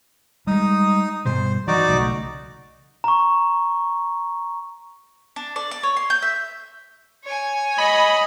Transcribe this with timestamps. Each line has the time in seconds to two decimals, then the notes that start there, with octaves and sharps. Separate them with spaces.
0.47 G3 G#3 D#4 D#6
1.25 G2 B2 G3 C5
1.68 E3 F3 D#4 F#4 D5
1.88 B1 C#3 A3
3.04 A#5 C#6
5.36 D4
5.56 D5
5.71 D5
5.83 C#5
5.97 C6
6.10 G6
6.22 E5
7.24 C#5 G#5
7.78 D#5 B5